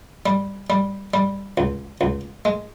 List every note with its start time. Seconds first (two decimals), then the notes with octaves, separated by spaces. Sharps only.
0.26 G3
0.70 G3
1.14 G3
1.58 C#2
2.01 C#2
2.45 G#3